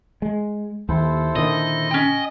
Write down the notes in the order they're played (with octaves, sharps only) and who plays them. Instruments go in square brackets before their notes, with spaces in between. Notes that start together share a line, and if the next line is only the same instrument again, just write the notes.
[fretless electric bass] G#3
[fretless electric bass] D#2 [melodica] E4 A4 C5
[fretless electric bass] A#2 D3 D#3 [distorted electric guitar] D#5
[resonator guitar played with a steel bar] C#4 G5